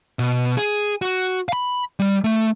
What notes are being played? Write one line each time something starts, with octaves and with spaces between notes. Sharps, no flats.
B2
G#4
F#4
F5 B5
G3
A3